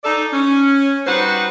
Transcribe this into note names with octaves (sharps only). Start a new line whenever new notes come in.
D#4 A4 D5
C#4
G3 D#4 F#4 B4 C5 F#5